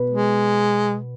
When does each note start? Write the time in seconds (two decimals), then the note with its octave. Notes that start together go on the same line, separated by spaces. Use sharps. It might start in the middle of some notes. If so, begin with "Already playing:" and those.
Already playing: B2 B3 B4
0.09 G#3